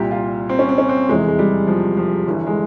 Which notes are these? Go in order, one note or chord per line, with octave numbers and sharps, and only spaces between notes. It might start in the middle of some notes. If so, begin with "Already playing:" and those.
Already playing: C2 A#2 G4
F4
C4
C#4
C4
C#4
C4
F1 E2 C3 E3 G#3
G#3
G3
F3
F3
G1 G2 E3
G#3